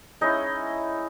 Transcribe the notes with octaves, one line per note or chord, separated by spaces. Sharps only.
G#3 C#4 D#4 E4 D#5